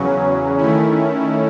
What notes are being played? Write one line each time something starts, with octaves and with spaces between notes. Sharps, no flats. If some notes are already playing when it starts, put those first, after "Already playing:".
Already playing: E2 C#3 F#3 C#4
D#3 A3 C#4 E4